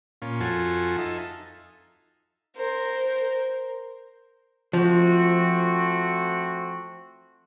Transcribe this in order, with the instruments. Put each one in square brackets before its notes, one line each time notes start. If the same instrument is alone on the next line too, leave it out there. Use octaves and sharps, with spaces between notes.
[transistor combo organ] A#2 C#4 F4
F2 F4 F#4 A4 G#5
D#4 F4 A4 E5
[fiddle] A#4 C5
[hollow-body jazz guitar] F3 [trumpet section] A3 C4 F#4